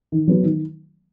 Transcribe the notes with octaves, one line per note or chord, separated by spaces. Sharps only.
D#3
F#3 B3
D#3